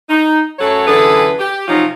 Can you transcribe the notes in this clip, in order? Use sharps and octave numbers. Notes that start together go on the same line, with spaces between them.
D#4
F#2 F#3 A3 F#4 A4 C#5
F#2 D3 E3 G#4 A4 B4
G4
C3 F3 F#3 C#4 D#4 F4